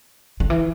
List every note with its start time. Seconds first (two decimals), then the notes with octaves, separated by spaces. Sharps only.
0.40 D3
0.50 E3